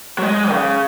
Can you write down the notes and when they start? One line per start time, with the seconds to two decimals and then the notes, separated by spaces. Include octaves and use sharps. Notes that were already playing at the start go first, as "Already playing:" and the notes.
0.18 F#3
0.22 G#3
0.51 C#3